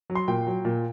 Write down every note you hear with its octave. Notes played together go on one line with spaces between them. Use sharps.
F#3
C6
A#2 G5
F#3
A#2